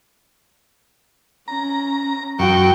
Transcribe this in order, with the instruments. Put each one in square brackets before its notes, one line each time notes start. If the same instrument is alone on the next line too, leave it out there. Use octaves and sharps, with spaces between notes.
[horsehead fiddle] C#4 [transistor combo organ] A#5
[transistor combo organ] F#2 C#6 [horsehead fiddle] F#4 G5